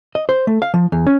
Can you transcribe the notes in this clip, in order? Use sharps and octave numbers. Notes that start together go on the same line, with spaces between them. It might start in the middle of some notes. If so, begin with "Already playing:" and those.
D#5
C5
A3
F5
F3
E2
C#4